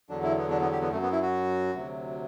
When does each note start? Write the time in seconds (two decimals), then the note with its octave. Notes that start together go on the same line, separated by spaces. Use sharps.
0.09 E2 D3 F#3 D4
0.23 E4
0.37 B3
0.50 D4
0.61 B3
0.72 G4
0.81 B3
0.91 F#2 F#3 A3
1.02 B3
1.12 E4
1.22 F#4
1.75 D2 C3 F#3